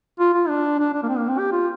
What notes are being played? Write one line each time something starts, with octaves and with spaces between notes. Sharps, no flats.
F4
F4
D4
D4
D4
A#3
C4
A#3
C4
G4
F4